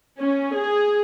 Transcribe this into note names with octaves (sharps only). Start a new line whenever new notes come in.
C#4
G#4